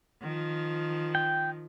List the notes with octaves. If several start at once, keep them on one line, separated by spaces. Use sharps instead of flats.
D#3 F3
G5